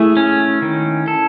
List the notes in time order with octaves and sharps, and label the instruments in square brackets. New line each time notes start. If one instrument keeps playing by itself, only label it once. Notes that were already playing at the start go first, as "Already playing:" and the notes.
Already playing: [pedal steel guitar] A3 G#4 [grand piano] E4
[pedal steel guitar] C#4
D#3
A4